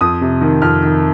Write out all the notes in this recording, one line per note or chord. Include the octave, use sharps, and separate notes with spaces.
F2 D#6
C3
D#3
F2 F6
D#3